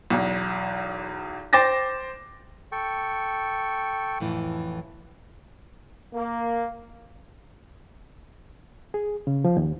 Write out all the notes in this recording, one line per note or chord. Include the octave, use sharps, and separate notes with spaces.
B1 E2
C5 G5 D6 A6 A#6
A4 G5 C#6
F2 A2 E3
A#3
G#4
C#3
F3
D#2